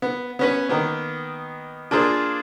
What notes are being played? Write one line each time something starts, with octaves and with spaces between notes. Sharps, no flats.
B3
B3 C#4 B4
D#3 A#3 B3
A#3 D4 F4 G#4 C5